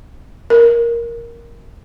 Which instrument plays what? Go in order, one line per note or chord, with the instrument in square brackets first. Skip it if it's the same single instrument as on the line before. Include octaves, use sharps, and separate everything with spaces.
[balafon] A#4